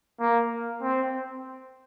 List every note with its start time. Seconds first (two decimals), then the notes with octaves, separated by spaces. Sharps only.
0.20 A#3
0.82 C4